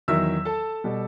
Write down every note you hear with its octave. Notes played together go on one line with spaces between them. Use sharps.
E2 D#3 F#3 E5 E6
A4 A5
B2 G3